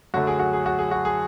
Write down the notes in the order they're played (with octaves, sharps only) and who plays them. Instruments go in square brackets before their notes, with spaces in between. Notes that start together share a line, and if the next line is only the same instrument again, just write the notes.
[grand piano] F#2 D3 F#3 A3 F#4
G#4
F#4
G#4
F#4
G#4
F#4
G#4